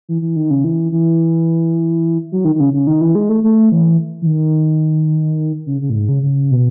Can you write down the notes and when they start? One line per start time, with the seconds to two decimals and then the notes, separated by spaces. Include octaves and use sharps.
0.09 E3
0.22 E3
0.36 D#3
0.50 C#3
0.64 E3
0.92 E3
2.32 F#3
2.45 D#3
2.55 D#3
2.60 C#3
2.73 C#3
2.87 D#3
3.01 E3
3.15 G#3
3.29 A3
3.44 A3
3.72 E3
4.22 E3
4.26 D#3
5.66 C#3
5.81 C#3
5.90 A2
5.95 G#2
6.09 C#3
6.23 C#3
6.51 B2